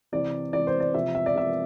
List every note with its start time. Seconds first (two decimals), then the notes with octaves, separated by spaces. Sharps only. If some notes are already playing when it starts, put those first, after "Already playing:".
0.12 C3 E3 D5
0.53 C3 E3 D5
0.67 C5
0.80 D5
0.94 C3 F3 E5
1.15 E5
1.26 D5
1.35 C3 F3 E5